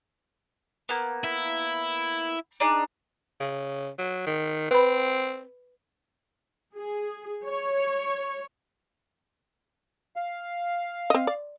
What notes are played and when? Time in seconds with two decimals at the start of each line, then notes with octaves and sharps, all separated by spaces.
0.89 A#3 B3
1.24 E4
2.60 D4 D#4 G#4
3.40 C#3
3.98 F#3
4.26 D#3
4.71 C4 B4 B5
6.75 G#4
7.45 C#5
10.16 F5
11.10 C4 D#5
11.27 D5